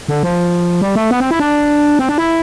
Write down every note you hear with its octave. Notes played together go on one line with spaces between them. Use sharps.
D3
F3
G3
A3
B3
C4
E4
D4
C4
D4
E4